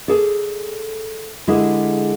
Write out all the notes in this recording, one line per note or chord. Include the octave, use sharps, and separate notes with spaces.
G#4 A4 D5
D3 G#3 E4 G4 G#4